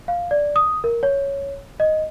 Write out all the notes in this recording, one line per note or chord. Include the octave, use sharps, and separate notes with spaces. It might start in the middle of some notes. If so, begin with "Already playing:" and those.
F5
D5
D#6
A#4
C#5
D#5